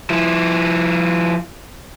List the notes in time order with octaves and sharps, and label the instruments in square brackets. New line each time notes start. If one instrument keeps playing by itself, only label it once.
[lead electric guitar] F3 E4